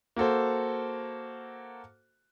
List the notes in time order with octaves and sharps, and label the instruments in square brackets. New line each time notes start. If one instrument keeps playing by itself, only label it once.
[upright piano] A#3 F#4 A4 C5